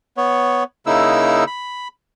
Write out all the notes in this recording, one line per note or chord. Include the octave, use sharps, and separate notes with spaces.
B3 C#5
C#3 A#3 D#4 E4 E6
B5